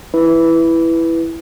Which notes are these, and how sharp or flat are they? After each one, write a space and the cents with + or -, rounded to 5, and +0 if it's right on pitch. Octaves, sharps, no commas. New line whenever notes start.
E4 +0 B4 +0